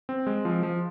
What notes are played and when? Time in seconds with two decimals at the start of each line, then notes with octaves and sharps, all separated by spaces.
0.09 C4
0.27 G#3
0.45 F3
0.63 F3